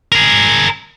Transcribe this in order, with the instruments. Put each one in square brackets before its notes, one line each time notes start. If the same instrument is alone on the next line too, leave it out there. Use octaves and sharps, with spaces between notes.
[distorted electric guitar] G#4 A#4